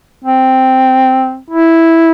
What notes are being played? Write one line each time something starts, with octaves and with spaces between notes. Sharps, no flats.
C4
E4